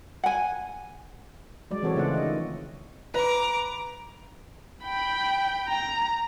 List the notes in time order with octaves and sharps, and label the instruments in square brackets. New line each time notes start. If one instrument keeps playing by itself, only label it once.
[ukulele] F#5 G#5
[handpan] F#3 G#3 D5
E3 C4 F#4 A4 C#5
C#3 A3 C4 F4 D5 F#5
D#3 D#5
[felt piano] B4 [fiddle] A#5 D6
[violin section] G5 [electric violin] B5
[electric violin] A#5